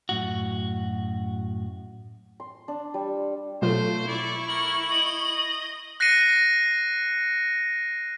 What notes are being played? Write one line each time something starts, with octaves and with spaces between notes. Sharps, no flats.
F#2 A2 F#4
C6
D4
G3
B2 F#3 A3 F4 C5
E4 D5 C#6
A#4 F#7
D#5
F#6 A#6 C7 C#7 D#7